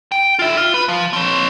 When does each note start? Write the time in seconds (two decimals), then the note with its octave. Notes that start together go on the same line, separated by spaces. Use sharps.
0.12 G5
0.39 F4 E5
0.57 F4
0.74 B4
0.88 F3
1.13 C4 C#5